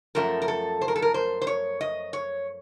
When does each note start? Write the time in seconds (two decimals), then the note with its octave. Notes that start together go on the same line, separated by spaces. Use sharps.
0.15 F#2 F3 A3 A#4
0.42 A#4
0.48 A4
0.81 C5
0.88 A#4
0.96 A4
1.02 A#4
1.14 C5
1.42 C5
1.47 C#5
1.81 D#5
2.13 C#5